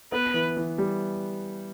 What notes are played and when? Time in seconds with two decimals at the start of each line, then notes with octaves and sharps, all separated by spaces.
0.12 B3 B4
0.34 E3
0.57 E3
0.78 G3